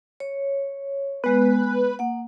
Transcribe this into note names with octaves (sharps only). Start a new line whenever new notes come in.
C#5
G#3 B3 B4
A#3 F#5